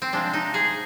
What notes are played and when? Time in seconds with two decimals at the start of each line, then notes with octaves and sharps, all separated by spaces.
0.02 C4
0.13 C3 F3 G#3 D4
0.33 D#4
0.54 G#4